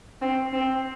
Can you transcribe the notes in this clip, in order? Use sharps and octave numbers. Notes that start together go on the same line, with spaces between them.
C4
C4